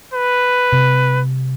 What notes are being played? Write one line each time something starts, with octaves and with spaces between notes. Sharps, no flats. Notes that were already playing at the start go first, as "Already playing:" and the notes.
B4
C3